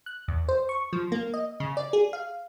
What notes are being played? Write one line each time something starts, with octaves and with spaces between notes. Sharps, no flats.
F#6
E2
C5
C#6
F3
A#3
D#5
C#3
D5
G#4
F5